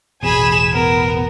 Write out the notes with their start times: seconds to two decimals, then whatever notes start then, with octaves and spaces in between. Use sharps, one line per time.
0.23 A1 E2 B2 G#4 G#5 B5 E7
0.72 B3 A#4